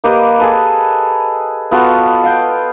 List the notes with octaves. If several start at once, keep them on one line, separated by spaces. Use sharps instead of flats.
A#3 G4 B4 D#5
G#4 A4 B4
B3 F4 F#4 A4
F5 G5